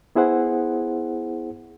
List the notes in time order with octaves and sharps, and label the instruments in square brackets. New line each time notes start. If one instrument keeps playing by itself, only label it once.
[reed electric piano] B3 E4 G#4 C5 F#5